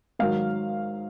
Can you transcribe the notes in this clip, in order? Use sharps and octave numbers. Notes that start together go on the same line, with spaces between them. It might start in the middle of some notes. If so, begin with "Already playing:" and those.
G#2 D#3 F#3 F5